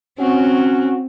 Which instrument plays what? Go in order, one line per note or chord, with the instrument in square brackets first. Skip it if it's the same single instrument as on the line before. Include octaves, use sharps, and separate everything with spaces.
[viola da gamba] C4 [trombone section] C#4 F#4